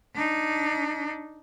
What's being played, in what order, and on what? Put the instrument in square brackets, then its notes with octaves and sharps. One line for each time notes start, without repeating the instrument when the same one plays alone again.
[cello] D4 D#4